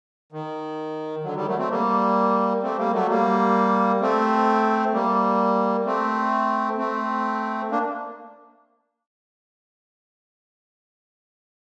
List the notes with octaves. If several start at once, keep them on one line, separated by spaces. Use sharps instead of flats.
D#3
D3 F#3
D#3 G3
F#3 A3
A3 C4
G3 A#3
A3 C4
G3 A#3
F#3 A3
G3 A#3
A3 C4
G3 A#3
A3 C4
A3 C4
A#3 D4